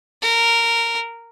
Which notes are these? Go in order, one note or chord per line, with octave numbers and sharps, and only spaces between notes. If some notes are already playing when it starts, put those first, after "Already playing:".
A#4